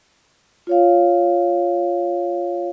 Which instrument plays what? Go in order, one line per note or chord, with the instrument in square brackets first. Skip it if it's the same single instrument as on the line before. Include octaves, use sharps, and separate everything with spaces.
[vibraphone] F4 C#5 F5